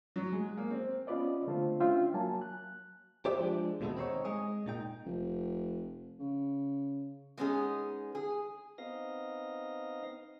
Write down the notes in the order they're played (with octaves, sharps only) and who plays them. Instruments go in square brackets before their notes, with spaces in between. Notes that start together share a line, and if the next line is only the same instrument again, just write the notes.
[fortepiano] F#3
G#3
A#3
C4
[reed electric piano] B3 C#4 F4 B4 D5 D#5
D3 A3 C4 F4 C5
C#4 D4 F4 E5 G5
F#3 A#3 G#5 A5
F#6
[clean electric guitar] G4 C5 D5 E5 G5
F3 G#3 D4
D#2 B2 G#3 A3 B3
C4 D#4 C5 C#5
G#3 G#4 D#5
A#2 D#4 G5
[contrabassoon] F1
C#3
[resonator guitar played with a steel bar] G#3 B3 C#4 D#4 G#4
G#4
[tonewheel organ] B3 C4 D#4 D#5 F5 A#6